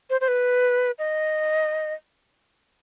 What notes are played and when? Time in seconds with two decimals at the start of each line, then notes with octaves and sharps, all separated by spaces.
0.10 C5
0.21 C5
0.28 B4
0.99 D#5